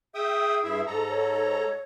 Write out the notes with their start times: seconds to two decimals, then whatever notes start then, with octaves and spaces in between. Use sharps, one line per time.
0.15 G#4 E5 G5 D#6
0.64 G2 E4 E5
0.87 G#2 A4 A#5
1.09 C#5